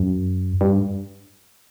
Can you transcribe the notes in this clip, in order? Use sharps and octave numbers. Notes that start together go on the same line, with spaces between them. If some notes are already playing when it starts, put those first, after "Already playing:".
Already playing: F#2
G2